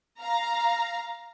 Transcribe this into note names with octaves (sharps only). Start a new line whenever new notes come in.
F5 A#5